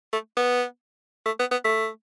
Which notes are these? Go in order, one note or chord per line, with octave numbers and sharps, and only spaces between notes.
A3
B3
A3
B3
B3
A3